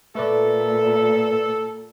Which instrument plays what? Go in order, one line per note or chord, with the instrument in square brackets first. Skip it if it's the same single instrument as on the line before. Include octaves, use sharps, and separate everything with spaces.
[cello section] A#2 [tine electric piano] A3 B4 D5 [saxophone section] A4